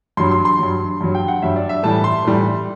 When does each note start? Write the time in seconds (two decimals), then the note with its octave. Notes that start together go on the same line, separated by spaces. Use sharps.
0.17 G2 F#3 C6
0.31 C6
0.45 C6
0.59 G2 F#3
1.01 G2 F#3
1.15 G5
1.28 F#5
1.42 G2 F#3 E5
1.56 D5
1.69 E5
1.83 A2 E3 G3 A5
2.04 C6
2.25 A2 E3 G3